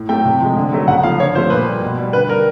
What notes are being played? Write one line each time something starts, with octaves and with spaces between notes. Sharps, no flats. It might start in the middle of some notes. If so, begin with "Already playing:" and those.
Already playing: A2
F#3 A3 G5
C3
F3 G#3
D3
F#3 A3
C#3 F#5
F3 A3 F5
D3 C#5
F3 A3 C5
A#2 B4
G3
B2
G3
D3 B4
G3 A#4